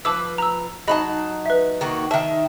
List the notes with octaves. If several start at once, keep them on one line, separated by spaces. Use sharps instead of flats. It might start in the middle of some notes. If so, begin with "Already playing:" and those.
F3 B4 A5 D6 E6
A#5 E6
F#3 D#4 D#5 A5 B5
B4 E5
D#3 A#3 F#4
D#3 E5 A5